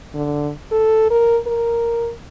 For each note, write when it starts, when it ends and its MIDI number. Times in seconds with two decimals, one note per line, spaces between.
0.14 0.50 50
0.72 1.06 69
1.10 1.38 70
1.47 2.11 70